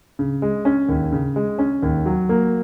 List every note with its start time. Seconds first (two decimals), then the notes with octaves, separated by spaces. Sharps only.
0.19 C#3
0.42 G#3
0.65 C#4
0.89 D#2
1.12 C#3
1.36 G#3
1.59 C#4
1.83 D#2
2.06 F#3
2.29 A#3